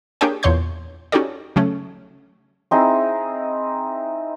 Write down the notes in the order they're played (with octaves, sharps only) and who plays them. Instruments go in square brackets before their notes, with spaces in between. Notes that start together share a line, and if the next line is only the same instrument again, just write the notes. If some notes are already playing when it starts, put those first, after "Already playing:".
[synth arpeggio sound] A#3 D4 G4 G#4 C#5 G5
E2 A#2 C#5 C6 G6
C#4 D#4 F#4 G4 A4 D5
C#3 F#3 A3 C#4
[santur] C4 D#4 E4 G#4